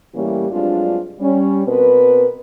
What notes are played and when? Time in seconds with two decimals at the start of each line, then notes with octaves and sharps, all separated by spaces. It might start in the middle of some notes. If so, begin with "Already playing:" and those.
0.14 A2 E3 G3 A#3 C#4 G4
0.50 G2 F#3 G#3 C4 D4 F4
1.20 G3 C#4
1.67 B2 C4 A#4 B4